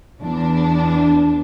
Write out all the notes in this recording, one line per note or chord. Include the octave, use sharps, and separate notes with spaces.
E2 D4